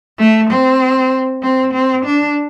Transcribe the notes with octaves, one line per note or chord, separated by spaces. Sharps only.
A3
C4
C4
C4
D4